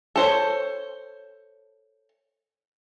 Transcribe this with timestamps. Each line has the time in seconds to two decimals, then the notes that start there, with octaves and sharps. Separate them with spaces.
0.16 A4 C5 C#5